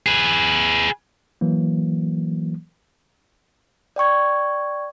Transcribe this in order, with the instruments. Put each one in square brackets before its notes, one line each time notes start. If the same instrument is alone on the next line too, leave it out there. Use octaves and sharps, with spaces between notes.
[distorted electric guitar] G#4 B4
[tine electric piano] E3 F#3 A#3
[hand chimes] D5 G5 C#6 G#6